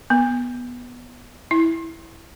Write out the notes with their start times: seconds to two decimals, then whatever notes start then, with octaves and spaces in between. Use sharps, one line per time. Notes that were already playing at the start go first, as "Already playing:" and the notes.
0.10 B3
1.51 E4